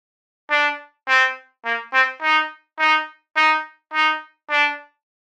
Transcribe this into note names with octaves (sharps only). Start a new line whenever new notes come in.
D4
C4
A#3
C4
D#4
D#4
D#4
D#4
D4